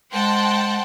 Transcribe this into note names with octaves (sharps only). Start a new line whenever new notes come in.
G#3 C5 F#5 G5 A5